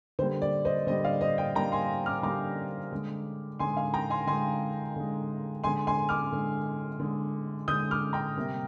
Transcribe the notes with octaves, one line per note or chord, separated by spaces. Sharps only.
D3 G3 A#3 C5
D5
C5 D#5
D3 G3 A#3 C5 D#5
D5 F5
C5 D#5
D#5 G5
D3 G3 A#3 G5 A#5
G#5 C6
D6 F6
D3 G3 A#3 A#5 D6
D3 G#3
D3 G#3 G#5 C6
F5 G#5
G5 A#5
G#5 C6
D3 G#3 G#5 C6
D3 G#3
D3 G#3 G#5 C6
G#5 C6
D6 F6
D3 G#3
D3 G#3
D3 G#3 D#6 G6
D6 F6
G5 A#5
C3 G3 A#3